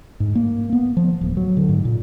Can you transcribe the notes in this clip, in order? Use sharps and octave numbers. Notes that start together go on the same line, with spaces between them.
G#2
A#3
B3
F3
D1
F#3
D3
G#2
A#2